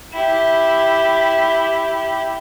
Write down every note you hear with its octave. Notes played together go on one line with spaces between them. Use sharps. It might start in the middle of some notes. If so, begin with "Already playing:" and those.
E4 G4